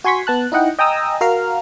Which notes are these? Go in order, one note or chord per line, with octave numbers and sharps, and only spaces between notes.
F#4 G#5 C6 C#6 B6
B3 A5 F#6
D#4 E4 D#5 F#5 G5
D#5 G5 G#5 A#5 D#6 E6
F#4 A#4 F5 F6